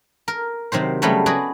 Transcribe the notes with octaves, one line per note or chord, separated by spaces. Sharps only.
A#4
C3 D#3 F#3 C5
C#3 F#3 G3 A3 B3
F#4 G#4 B4 D5 D#5